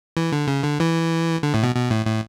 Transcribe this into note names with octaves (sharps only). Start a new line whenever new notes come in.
E3
D3
C#3
D3
E3
D3
A2
B2
B2
A2
A2